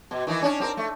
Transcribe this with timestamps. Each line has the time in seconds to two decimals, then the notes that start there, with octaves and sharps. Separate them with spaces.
0.11 B2
0.27 D#3 E3 D#4
0.42 C#4 D4
0.60 C4 G4 A#4
0.77 A3